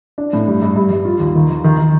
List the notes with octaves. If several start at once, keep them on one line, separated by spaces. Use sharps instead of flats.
D4
A2
G2
G2
G2
G2
F4
D#2
D#3
D#3
D#3
D#3